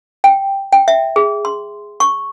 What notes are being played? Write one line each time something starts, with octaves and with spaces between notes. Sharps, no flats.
G5
G5
E5
G#4
C6
C#6